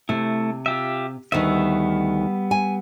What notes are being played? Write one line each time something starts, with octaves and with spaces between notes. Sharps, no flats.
C3 A3 E4
F4 G4 E5
D2 D#3 G3 B3 E5
G#5